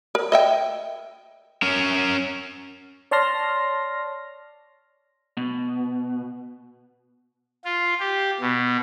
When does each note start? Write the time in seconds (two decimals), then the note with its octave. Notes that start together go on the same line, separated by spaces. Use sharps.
0.15 A#4
0.32 D#5 E5 G5
1.63 C#4 A#4
3.11 C#5 D5 A5 C6 F6 A#6
5.37 B2
7.65 F4
8.00 G4
8.41 B2